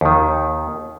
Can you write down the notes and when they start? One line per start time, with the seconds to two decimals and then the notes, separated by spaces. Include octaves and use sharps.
0.01 D#2 D#3